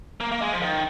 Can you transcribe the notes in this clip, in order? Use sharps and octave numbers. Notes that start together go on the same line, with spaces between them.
A#3
A#3
G#3
F3
D#3